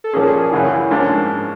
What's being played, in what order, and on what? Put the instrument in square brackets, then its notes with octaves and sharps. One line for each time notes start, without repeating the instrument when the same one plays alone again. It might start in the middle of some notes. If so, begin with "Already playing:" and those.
[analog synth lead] A4
[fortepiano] A#2 F3 A#3 C#4 [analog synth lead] G#4
[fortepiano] F#2 C#3 E3 [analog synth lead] E4
[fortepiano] G#2 F3 A#3 C#4 [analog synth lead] D4